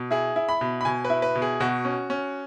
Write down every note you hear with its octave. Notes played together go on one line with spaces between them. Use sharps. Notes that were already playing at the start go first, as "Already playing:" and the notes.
Already playing: B2
E4 G#4
E4
B5
B2
B5
B2 G#5
B4
E4
B4
B2
G#4
B2 F#4
C#4
C#4